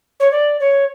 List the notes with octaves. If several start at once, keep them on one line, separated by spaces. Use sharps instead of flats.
C#5
D5
C#5